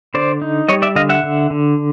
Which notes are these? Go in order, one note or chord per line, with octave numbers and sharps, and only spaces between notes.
D3 C5 D5
D#4
G3 C#5 D#5
D5 E5
D3 D#5 F5
E5 F#5
D3
D3